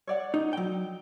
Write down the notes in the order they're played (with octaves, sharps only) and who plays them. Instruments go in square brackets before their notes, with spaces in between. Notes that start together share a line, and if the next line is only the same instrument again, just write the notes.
[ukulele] C#5 D5 F#5
[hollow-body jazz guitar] D#4
F#3 G5